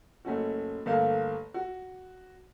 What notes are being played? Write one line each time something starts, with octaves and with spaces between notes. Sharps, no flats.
F#1 A3 C#4 F#4
G1 A3 A#3 F5
F#4